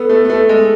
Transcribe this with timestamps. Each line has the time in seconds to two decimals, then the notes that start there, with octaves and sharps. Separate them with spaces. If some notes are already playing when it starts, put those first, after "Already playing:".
Already playing: B3 A4
0.09 A3
0.24 B3
0.30 A3
0.49 G#3